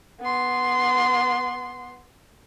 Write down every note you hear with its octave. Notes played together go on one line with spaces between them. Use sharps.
B3 C6